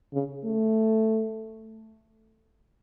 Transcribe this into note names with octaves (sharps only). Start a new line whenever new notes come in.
C#3
A3